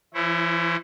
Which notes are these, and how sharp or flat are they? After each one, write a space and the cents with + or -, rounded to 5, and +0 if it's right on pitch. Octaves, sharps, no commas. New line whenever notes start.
E3 +45 E4 +0 C#5 -35